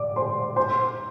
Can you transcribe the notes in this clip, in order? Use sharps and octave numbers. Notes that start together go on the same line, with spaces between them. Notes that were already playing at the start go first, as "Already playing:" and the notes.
Already playing: D5 D6
C5 C6
C5 C6